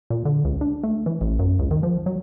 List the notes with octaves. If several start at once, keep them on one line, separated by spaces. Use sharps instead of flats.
A#2
D3
C#2
D4
A3
E3
A1
F#2
C#2
D#3
F3
F#3